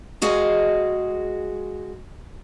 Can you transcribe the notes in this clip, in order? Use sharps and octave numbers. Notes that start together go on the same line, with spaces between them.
G#3 F#4 G#4 D#5 F5